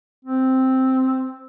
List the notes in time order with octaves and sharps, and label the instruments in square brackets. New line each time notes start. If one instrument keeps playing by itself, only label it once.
[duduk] C4